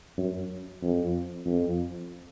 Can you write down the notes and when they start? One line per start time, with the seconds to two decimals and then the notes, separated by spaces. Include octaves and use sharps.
0.18 F#2
0.82 F2
1.46 F2